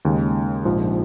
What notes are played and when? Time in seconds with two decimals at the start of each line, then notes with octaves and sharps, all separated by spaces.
0.05 D#2 C#3 G#3
0.65 A#1 G#2 F3